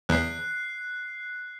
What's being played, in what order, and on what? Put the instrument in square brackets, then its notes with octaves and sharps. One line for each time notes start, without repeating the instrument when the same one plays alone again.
[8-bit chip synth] E2 [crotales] F#6 C7